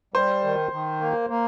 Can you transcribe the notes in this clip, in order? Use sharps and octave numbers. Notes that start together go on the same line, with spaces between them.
G3 C5
D#3
D#3
A#3
A#3